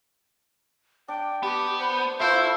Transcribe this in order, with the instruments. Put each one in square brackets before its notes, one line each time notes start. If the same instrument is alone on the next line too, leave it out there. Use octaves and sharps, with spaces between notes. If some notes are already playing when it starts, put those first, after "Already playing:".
[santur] D4 [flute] G5
[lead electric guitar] B3 [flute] G4
[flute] C5
[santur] A3 F4 B4 [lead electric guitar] E4 E5 [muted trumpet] C5 [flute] E6